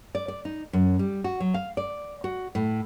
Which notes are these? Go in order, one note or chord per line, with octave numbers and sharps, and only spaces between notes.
D5
D5
D#4
F#2
G3
F#4
F#3
F5
D5
F#4
A2